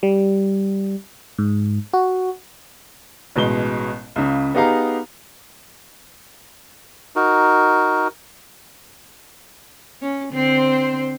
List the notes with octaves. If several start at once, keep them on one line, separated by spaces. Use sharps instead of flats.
G3
G#2
F#4
A1 B2 G#3 G7
C#2 C#3
B3 D#4 G4 G#4 F5 A#5
D#4 F#4 A#4
C#4
D3 C4 C5